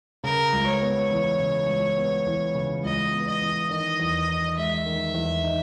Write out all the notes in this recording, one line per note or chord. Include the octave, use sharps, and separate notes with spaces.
C#3 A#4
C#2
C#5
B3
E3
C#3
C#2
B3
E3
C#3
C#2 D#5
B3
D#5
E3
D#3 D#5
E2
D#4
G#3 E5
D#3
E2
D#4